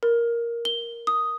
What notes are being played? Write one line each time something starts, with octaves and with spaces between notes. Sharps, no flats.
A#4
G7
D#6